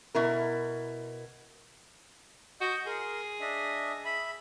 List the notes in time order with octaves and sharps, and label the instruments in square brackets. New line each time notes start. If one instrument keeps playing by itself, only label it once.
[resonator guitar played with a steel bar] B2 E4 A#4
[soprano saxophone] F#4 [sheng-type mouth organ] D#5 G6
[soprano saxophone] G#4 [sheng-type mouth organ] A#4 C6
[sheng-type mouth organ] D4 D#5 E5
E5 B5